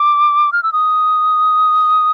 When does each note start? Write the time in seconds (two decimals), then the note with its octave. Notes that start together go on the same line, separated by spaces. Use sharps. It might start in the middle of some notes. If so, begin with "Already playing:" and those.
Already playing: D6
0.53 F6
0.63 E6
0.73 D#6